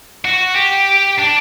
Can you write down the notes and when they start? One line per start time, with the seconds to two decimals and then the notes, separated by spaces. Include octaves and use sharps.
0.25 F#4
0.56 G4
1.19 D4